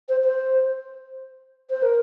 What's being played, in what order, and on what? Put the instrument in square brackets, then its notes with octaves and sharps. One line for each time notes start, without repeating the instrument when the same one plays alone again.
[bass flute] C5
C5
C5
A#4